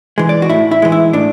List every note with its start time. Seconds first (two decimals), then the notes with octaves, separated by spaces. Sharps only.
0.18 E3 G#3
0.29 D5
0.42 F#4
0.50 A2 E4
0.71 E4
0.82 E3 G#3
0.92 E4
1.13 A2 D4